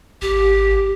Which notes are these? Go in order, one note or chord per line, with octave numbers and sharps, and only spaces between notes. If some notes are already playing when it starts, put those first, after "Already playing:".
G#1 G4